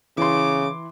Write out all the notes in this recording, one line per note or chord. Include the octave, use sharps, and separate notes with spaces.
C#3 E3 C6 D6